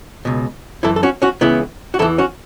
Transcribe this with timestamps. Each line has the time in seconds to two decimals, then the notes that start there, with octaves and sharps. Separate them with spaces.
0.25 C#2 B2
0.83 F#2 E3 E4 A4
0.96 A4
1.03 C#4 F#4
1.22 C#4 F#4
1.41 C#2 C#3 E3 B3 E4
1.94 F#4
1.99 E2 E3 E4 A4
2.18 C#4 F#4